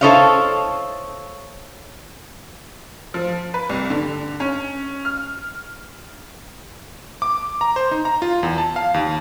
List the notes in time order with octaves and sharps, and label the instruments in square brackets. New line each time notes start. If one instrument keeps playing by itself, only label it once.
[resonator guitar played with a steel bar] E4 A4 C5 C#5 D#5 F5
[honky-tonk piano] F3
B4
C2
D3
C#4
F6
[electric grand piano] D6
A#5
C5
D#4
A#5
F4
E2
A5
F5
D#2